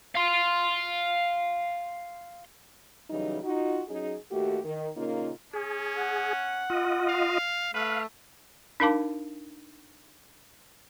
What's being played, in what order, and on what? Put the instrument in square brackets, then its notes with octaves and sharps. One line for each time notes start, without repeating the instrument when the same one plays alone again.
[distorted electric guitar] F5 C6
[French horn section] C#3 E3 F#3 G3 D#4
D#4 F4 F#4
F#3 C#4 D#4 G#4
D#2 A3 F#4 G4
D#3
A#2 C#3 A#3 C#4 D#4 F4
[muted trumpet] C#4 [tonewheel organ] G#4
[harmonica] F#5
[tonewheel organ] F4 D#5
[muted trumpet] F5
[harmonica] A3 [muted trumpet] B4 [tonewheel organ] F5
[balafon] D4 D#4 A#4 F5 A5 D6